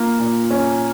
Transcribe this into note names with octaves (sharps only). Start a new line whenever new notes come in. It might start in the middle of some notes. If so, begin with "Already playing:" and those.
Already playing: A#3 F4
A#2
C#4